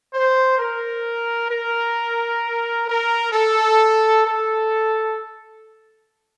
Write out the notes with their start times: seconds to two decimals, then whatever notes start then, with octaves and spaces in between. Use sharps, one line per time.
0.13 C5
0.58 A#4
1.50 A#4
2.87 A#4
3.33 A4
4.25 A4